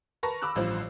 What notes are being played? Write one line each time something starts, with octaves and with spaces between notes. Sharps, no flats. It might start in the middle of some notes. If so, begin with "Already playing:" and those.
A#4 B4 A5 C#6 A#6
B5 D6 E6 F#6
A1 G2 F3 C5